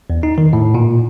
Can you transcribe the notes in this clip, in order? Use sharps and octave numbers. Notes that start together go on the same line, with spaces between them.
E2
D#4
D#3
A2
A#2